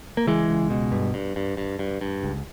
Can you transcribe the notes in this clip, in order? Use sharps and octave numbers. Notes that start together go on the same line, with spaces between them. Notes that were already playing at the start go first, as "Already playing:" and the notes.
A#3
C#2 E3 G#3
C#2
B2
G2
G2
G2
G2
G2
G2
C#2